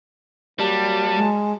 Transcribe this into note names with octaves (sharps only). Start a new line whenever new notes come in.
F#3 G3 A#3 G4 A5
G#3